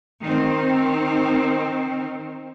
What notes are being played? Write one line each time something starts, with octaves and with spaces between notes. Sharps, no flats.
D#3 C4